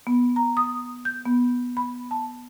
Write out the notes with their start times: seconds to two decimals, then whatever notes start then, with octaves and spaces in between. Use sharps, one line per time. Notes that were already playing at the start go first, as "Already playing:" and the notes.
0.07 B3
0.36 A#5
0.57 D#6
1.05 G6
1.25 B3
1.77 B5
2.11 A5